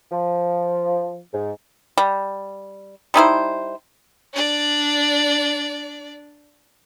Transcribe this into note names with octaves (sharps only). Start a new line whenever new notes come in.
F3
G#2
G3
G3 D#4 E4 C5
D4 D5